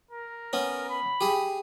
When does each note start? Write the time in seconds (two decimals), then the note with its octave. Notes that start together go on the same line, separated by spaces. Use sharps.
0.11 A#4
0.53 B3 C#4
0.89 B5
1.21 G4 G#4